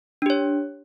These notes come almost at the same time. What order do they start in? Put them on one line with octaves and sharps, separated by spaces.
D4 G4 C#5